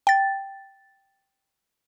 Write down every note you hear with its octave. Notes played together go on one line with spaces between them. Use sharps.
G5 A6